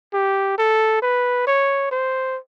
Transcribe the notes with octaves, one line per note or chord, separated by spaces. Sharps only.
G4
A4
B4
C#5
C5